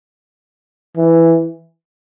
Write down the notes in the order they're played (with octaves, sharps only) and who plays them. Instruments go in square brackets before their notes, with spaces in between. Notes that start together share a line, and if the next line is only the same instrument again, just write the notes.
[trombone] E3